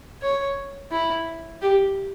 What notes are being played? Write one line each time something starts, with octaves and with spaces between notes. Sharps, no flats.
C#5
E4
G4